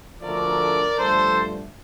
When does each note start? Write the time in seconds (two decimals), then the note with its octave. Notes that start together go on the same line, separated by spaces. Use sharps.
0.21 D2 D3 F3 A3 A#4 D5
0.97 G2 D3 F3 A3 A4 C5